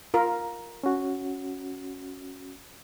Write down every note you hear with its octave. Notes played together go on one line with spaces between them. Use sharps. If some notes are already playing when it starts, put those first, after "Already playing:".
F4 A#4
C#4 F#4